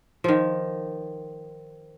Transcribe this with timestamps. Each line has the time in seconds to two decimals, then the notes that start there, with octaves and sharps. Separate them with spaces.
0.24 D#3 F3